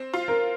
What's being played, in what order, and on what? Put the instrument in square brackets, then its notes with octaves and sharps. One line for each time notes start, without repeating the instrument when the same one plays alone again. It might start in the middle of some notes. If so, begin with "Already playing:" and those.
Already playing: [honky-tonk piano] C4
F4
[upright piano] A#4